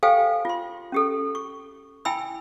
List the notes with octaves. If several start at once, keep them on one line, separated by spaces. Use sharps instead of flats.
G4 A4 C5 F5 G5 G#5
F4 C6
C#4 G4 A4
C#6
E4 G5 G#5 B5 E6